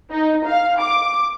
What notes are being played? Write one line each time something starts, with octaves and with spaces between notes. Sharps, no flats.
D#4
F5
D6